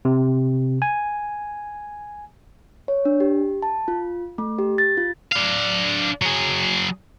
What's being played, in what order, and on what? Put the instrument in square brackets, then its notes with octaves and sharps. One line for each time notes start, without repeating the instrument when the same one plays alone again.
[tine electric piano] C3
G#5
[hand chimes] C#5
D4
G4
A5
F4
A3
G4
A6
F4
[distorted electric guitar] D4 F5
F#3 G#4